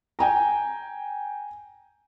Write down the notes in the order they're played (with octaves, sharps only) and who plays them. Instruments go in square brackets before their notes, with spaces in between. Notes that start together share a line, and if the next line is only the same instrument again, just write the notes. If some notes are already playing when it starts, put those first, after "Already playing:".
[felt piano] G5 G#5 A#5